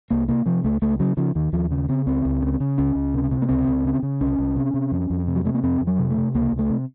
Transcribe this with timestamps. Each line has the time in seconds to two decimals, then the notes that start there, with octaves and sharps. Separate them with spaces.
0.10 C2 A#3
0.29 C3 A#3
0.46 C3 F3
0.64 C#2 A3
0.82 C#2 A3
1.00 C#3 F#3
1.17 C#3 F3
1.35 D#2 D#3
1.53 D#2 F3
1.71 C#3
1.89 C#3 C4
2.06 C#2 C4
2.25 C#2
2.42 C#3
2.60 C#3
2.78 C#2 C#4
2.95 C#2
3.14 C3
3.31 C3
3.42 A#3
3.49 C#2 C4
3.67 C#2
3.85 C#3
4.03 C#3
4.21 C2 C#4
4.39 C2
4.56 C3
4.74 C3
4.91 F2
5.10 F2
5.27 C3
5.36 F#3
5.45 C3 A3
5.54 A#3
5.63 F2 C4
5.81 F2
5.87 F#3
5.99 C3
6.10 A3
6.17 C3
6.35 C#2 A#3
6.52 C#2
6.59 A3
6.70 C3